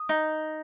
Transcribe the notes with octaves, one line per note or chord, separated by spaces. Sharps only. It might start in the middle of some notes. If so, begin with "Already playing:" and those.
Already playing: D#6
D#4